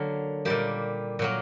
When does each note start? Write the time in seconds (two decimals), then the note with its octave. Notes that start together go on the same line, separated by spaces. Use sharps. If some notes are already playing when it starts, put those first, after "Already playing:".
Already playing: D3 F#3 A#3
0.45 A#2 G3 A#3 G4
1.19 A#2 F#3 A#3